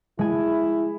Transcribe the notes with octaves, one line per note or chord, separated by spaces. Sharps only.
G#3 E4 G#5